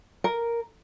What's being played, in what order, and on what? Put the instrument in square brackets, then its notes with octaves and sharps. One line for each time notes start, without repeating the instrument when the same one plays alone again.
[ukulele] A#4